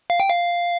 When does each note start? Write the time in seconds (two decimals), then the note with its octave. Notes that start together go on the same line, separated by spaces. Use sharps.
0.10 F5
0.20 G5
0.30 F5